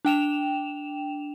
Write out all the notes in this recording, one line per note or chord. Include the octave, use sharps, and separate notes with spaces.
D4 G5 E7 F7